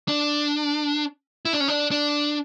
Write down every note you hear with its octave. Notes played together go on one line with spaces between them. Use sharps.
D4
E4
D4
C#4
D4
D4